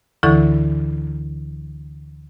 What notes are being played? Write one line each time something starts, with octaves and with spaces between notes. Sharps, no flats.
D2 D3 E3 E4 A4 C#6